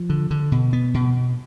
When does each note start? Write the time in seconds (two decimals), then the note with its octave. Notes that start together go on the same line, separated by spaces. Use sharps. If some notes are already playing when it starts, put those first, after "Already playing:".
Already playing: F3
0.10 D3
0.31 D3
0.52 B2
0.73 B3
0.94 B2